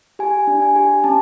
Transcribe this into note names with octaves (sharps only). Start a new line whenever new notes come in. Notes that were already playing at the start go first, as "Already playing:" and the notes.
G4 G#5
D4
G#5
G4
C#4 A5